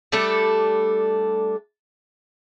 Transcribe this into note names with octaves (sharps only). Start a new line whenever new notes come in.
G3 A3 D4 A4